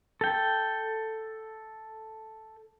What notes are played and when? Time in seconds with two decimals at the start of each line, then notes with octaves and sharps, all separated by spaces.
0.21 A4 G5